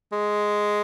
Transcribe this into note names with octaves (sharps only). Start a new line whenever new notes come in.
G#3